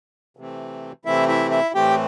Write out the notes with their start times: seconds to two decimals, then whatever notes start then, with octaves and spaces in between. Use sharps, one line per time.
0.37 C3 E3 A3 C4
1.05 C3 E3 A3 C4 E4 E5
1.28 E4 E5
1.51 E4 E5
1.75 A2 E3 A3 C4 G4 G5